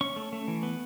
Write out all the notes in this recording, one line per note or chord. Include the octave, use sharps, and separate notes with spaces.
C#4 C#6
A3
A3
E3
B3